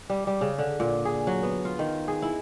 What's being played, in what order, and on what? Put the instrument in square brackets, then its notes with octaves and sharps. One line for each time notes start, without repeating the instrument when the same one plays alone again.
[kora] G3
G3
C#3
D3
A#2
G#4
F#3
B3
F4
D#3
G#4
E4